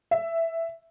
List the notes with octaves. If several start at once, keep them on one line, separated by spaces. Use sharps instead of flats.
E5